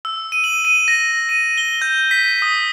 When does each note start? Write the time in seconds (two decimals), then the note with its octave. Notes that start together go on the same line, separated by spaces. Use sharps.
0.05 E6
0.32 D#7
0.44 F#7
0.65 D#7
0.88 A#6
1.29 D#7
1.58 G7
1.82 G6
2.11 B6
2.42 D#6